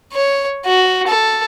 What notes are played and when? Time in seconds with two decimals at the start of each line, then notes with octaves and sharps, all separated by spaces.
0.13 C#5
0.65 F#4
1.07 A4